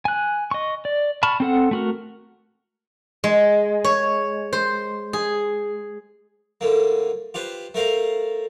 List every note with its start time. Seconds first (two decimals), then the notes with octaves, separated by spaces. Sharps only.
0.05 G#5 F#6
0.51 D#5 C#6
0.85 D5
1.23 A5 B5 C#6 F6
1.40 C4 A4 F#5
1.71 A3 F#4 A#4
3.24 G#3
3.84 C#5
4.53 C5
5.13 G#4
6.61 A2 D3 A#3
7.34 F4 G4 B4 C5
7.74 A3 A#4 C5 F5 A#5